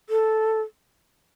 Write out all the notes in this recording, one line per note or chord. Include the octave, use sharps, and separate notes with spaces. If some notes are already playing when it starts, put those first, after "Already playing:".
A4